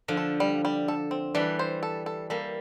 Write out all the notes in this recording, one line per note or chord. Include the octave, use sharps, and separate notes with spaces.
D3 F3
A4
G3
G3
A4
C4
E3 G3 D4
C5
A4
A4
G3 A#3 A4